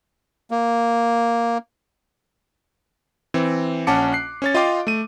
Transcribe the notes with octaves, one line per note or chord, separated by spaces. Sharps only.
A#3
E3 C4
A#1 C#4 F#5 A5 D6 C#7
F#6 C7
C#4 C#5 A6
F4 D#5 F5 G5 C6 D6
A3 D#7